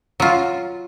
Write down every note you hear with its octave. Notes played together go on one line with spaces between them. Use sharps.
F#3 F4